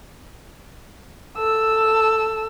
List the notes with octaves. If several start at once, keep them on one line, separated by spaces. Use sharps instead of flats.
A4 E6